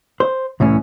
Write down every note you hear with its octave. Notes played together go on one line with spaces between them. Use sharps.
C5
C2 A2 E3 C#4